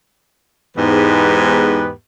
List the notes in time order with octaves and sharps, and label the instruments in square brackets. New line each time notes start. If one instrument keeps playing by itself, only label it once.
[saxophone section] E2 G#2 [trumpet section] B3 G4 B4